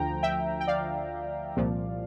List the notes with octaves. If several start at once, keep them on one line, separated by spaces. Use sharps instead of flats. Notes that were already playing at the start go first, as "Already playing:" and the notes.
Already playing: D2 D3 F3 G5 A#5
E5 G5
G5
D5 F5
C2 A#2 F3